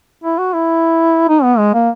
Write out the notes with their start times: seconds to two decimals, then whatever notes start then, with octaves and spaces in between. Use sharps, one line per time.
0.24 E4
0.38 F#4
0.54 E4
1.29 D#4
1.43 B3
1.58 G#3
1.74 A#3